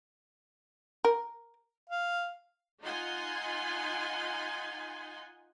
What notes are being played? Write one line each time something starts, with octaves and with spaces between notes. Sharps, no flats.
A#4
F5
D#4 F4 F#5 G#5 C6